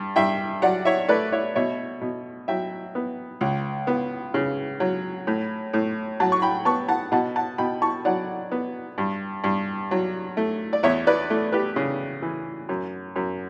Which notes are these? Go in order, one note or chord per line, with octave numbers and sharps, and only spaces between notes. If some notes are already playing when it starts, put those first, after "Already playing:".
Already playing: G2
G2 E5 G5
F#3 D5 F#5
C#5 E5
A3 B4 D5
C#5 E5
B2 C#5 E5
B2
F#3 E5 G5
B3
C#2
B3
C#3
F#3
A2
A2
F#3 F#5 A5
C#6
G5 B5
B3 A5 C#6
F#5 A5
B2 F#5 A5
F#5 A5
B2 G5 B5
A5 C#6
F#3 D5 F#5
B3
G2
G2
F#3
A3
D5
E2 C#5 E5
B4 D5
A3
G4 B4
C#3
E3
F#2
F#2